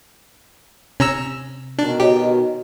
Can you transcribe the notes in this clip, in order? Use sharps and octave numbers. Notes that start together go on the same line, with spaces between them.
C3 C#4 A#5 E6
B2 D#3 D4
F#4 G4 C#5 D#5